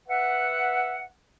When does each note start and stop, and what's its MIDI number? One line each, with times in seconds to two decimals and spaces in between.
0.08 1.05 71
0.08 1.05 76
0.08 1.05 78